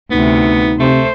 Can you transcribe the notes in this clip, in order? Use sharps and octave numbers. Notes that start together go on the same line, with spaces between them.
D2 C3 B3 D#4
C3 A3 C5